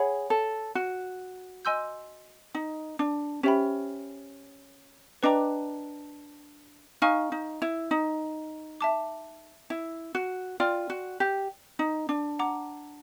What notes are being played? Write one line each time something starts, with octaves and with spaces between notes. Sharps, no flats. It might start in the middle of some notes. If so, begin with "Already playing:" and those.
Already playing: G#4 C#5 F#5 B5
A4
F#4
D#5 G#5 C6 E6 G6
D#4
D4
C#4 G4 C5 E5 G5 B5
D4 B4 D#5 G5 A#5 D6
D#4 F5 G#5 C#6 F6
D#4
E4
D#4
E5 A5 D6
E4
F#4
F4 D5 G5 C6 F6
F#4
G4
D#4
D4
F#5 A#5 D6